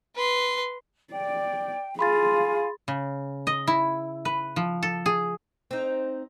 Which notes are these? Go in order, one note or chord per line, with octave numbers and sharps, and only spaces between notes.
B4 C6
D5 G5
F4 G#4 F5 G#5 B5 C6 A6
C#3
D#5
E4
B4
F3
A4
G#4
C4 D#4